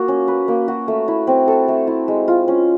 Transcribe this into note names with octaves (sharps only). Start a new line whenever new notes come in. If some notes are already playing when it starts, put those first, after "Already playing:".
Already playing: A#3 F#4
C#4
B4
A#3
F#4
A3
E4
C4
A4
A3
E4
G#3
F4
C#4